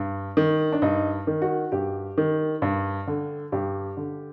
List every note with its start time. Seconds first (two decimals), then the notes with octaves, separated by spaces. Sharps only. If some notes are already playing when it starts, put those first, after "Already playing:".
Already playing: G2
0.37 D#3
0.73 D4
0.82 G2 D#4
1.27 D#3
1.42 F#4
1.72 G2 G4
2.18 D#3
2.62 G2
3.07 D3
3.52 G2 G4
3.97 D3